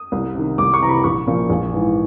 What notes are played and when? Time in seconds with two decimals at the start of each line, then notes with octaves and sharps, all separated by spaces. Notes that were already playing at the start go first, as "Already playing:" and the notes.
Already playing: D#6
0.12 C2
0.35 C3 D#3
0.58 C2 D6
0.74 C#6
0.81 E3 A#5
0.85 C3 B5
1.04 A#1 C#6
1.27 A#2 F3
1.50 A#1
1.73 G#2 E3